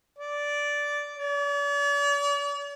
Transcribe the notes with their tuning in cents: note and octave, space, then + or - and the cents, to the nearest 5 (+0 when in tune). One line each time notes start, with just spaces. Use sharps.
D5 -10
D5 -45